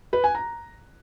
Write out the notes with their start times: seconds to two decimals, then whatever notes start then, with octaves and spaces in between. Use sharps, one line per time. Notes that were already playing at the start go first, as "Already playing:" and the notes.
0.13 B4
0.24 G#5
0.35 A#5